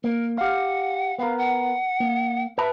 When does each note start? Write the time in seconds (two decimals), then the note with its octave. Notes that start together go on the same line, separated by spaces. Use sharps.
0.04 A#3 A#4
0.38 G4 F5 F#5
1.19 B3 A#4 F5
1.38 F#5
2.00 A#3
2.58 B4 E5 A5 B5